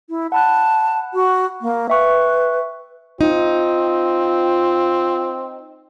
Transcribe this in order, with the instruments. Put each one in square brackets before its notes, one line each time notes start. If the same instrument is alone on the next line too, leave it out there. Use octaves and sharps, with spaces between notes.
[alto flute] E4
[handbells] F#5 B5 F#6 [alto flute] A5
[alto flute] F#4
A#3
[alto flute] B4 [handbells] E5 G5 C#6
[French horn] C4 [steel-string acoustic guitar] D#4 [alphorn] F4